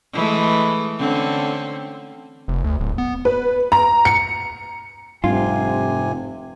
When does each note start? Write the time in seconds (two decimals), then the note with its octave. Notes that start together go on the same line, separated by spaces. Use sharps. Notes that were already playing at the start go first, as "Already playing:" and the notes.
0.13 E3 G#3 A3
0.98 D3 C4 C#4
2.48 F1
2.64 D2
2.80 D1
2.98 B3
3.25 B4
3.72 A#5
4.05 C#7
5.24 F1 G#2 C3 G3 D4 F4 G#5